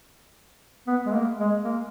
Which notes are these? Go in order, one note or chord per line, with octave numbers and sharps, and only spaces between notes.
B3
G#3
A#3
G#3
A#3